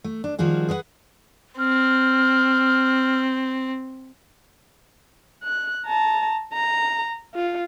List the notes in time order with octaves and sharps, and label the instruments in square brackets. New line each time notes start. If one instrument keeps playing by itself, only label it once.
[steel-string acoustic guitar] A3
D4
D#3 F3 G3 F#4 G#4
G#4 B4 C5 F#5
[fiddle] C4 [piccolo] F6
[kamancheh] F#6
A5 A#5
A#5
F4